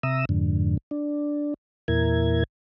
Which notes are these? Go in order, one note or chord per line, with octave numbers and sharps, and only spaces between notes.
C3 E5 A#5 D#6 E6
F2 G#2 D3
D4
E2 A#2 E4 A#4 G#6